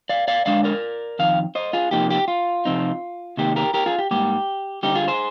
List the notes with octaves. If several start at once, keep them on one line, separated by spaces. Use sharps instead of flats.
D5 F5
D5 F5
D3 G#3 D4 D5 F5
A#4 D5
F2 D#3 F5
C5 D#5
F4 G#4
C3 F3 A#3 D#4 G4
G4
F4
C3 F3 C4 D#4
C3 D#3 A#3 D#4 G4
G4 A#4
G4 A#4
F4 G#4
G4
G#2 G3 A#3 G4
D3 G3 C4 D#4 G4
F4 G#4
G#4 C5